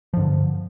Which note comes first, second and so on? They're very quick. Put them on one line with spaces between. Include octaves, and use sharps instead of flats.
F3 G2 D3